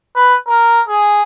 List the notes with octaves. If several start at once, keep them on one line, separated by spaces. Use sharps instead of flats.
B4
A#4
G#4